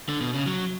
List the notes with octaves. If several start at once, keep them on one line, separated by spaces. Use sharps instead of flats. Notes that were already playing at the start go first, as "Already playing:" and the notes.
D3
B2
C#3
F#3